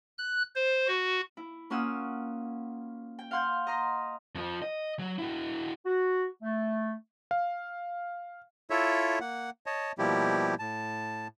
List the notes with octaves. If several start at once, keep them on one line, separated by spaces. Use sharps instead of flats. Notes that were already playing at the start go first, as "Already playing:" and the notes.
F#6
C5
F#4
E4
A#3 C#4 F4 F#5 D#6 E6
G5
F5 F#5 C6 G6
D#5 A#5 C6
F2 F3
D#5
F#3
E4 F#4
F#4
A3
F5
E4 F4 A4 C#5 E5
A#3 F#5
C#5 D#5 A5
B2 F3 G3 A#3 E4 G4
A2 A5